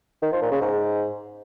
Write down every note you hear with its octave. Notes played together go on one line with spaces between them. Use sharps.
D#3
F3
A#2
C#3
G#2